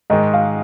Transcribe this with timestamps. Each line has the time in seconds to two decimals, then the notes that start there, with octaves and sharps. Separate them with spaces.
0.10 G#2 D#3 G#3 D#5
0.33 F5